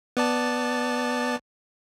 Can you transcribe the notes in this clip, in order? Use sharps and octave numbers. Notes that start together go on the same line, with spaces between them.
B3 D5 A5